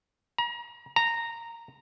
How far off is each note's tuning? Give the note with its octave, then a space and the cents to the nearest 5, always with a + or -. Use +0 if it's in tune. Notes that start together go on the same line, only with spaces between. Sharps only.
A#5 +35
A#5 -10